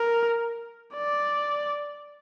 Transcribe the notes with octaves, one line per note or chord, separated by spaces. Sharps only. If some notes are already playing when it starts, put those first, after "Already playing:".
Already playing: A#4
D5